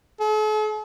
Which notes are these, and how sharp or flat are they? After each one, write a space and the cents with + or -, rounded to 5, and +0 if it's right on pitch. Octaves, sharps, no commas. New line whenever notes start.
A4 -45